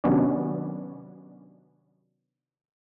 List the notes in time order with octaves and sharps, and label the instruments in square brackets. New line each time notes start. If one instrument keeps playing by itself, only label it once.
[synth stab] C3 D#3 F#3 B3 C#4 D4